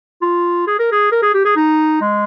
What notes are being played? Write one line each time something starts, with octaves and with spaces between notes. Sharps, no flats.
F4
G#4
A#4
G#4
A#4
G#4
G4
G#4
D#4
G#3